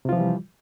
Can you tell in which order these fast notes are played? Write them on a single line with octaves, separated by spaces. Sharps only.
C3 F4 F3 E3 G3